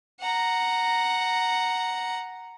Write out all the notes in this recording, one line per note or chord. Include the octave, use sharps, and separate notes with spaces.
F#5 A#5